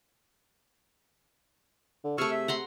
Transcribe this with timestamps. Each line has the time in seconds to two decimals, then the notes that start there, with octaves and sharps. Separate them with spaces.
2.04 D3
2.18 C3 A3 G#4 C#6 E6 F6
2.31 E5
2.48 F#5 A#5 C6